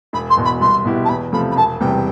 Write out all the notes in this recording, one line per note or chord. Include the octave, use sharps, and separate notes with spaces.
E1 B5
C6
E2 B2
B5
C2 C6
B2 B3 E4 G4
A5
E2 B5
C3 F3 A3 B5
B5
E1 A5
E2 C3 G3 G5